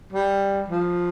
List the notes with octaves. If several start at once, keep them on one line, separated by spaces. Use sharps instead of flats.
G3
F3